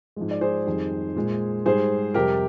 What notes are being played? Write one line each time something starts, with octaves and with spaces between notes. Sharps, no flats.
G#2 F3 G#3
D5
G#4 C5
F2 D#3 G3
A#2 G#3
G#2 G3 G#4 C5
F2 C3 G3 G4 A#4